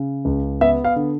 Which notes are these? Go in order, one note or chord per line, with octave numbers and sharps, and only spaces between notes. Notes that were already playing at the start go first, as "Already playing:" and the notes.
Already playing: C#3
C#2
B3 E5
F5
D3